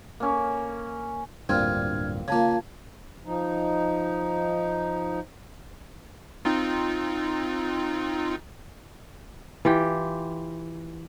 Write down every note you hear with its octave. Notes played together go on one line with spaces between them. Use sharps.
A#3 C#4
D1 G2 A#2 C4 F6 G#6
C#3 A#3 F4 A5 G#6
F3 D#4
C4 D#4 F4
E3 F4 G4 G5